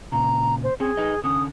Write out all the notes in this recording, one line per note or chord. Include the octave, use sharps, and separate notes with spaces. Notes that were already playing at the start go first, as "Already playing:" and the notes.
A#2 C#3 A#5
C5
C4 C#4 G#4
D#4 B4 D#5
D3 C#4 D#6